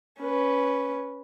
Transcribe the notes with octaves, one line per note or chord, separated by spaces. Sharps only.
C#4 B4